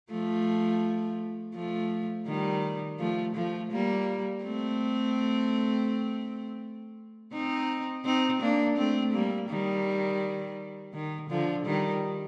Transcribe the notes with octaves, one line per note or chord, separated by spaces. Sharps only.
F3 A3
F3 A3
D#3 G3
F3 A3
F3 A3
G3 A#3
A3 C4
C4 D#4
C4 D#4
A#3 D4
A3 C4
G3 A#3
D#3 G3
D#3
D3 F3
D#3 G3